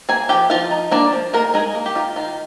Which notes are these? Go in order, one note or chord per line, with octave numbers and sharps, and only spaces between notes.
A#3 G#4 G#5
F3 G4 G5
F3 F4 F5
D#4
A#3 D4 D5
F3
D#3 A#3 A#4
G#3 D#4 G#4
A#3
G4
D#3 F4
D#3 F4